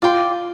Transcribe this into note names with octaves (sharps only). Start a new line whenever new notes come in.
F4 D5 G5 C6